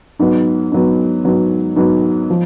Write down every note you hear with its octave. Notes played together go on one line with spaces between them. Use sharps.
G#2 F#3 B3
G#2 F#3 B3
G#2 F#3 B3
G#2 F#3 B3
F3